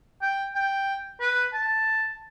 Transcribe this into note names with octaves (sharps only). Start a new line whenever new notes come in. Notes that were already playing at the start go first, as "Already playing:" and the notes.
G5
G5
B4
A5